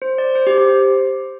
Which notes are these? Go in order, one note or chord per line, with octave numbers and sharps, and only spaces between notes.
C5
D5
C5
G4
G4
C5